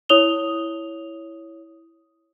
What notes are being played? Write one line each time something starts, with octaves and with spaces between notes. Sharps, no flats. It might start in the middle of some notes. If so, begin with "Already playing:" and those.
E4 C#5 D#6 F7 G7